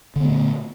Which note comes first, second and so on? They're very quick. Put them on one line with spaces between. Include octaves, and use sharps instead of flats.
D3 B3 A3 A#2